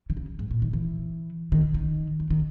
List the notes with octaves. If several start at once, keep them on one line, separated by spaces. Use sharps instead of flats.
D#3
C#3
G#2
A#2
D#3
E3
D#3
D#3
D#3
D#3